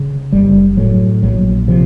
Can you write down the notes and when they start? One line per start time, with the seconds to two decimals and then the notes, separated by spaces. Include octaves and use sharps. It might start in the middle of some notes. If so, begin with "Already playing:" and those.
Already playing: C#3
0.32 F#1 G3
0.77 A2 F#3
1.23 A#1 F#3
1.68 C3 F3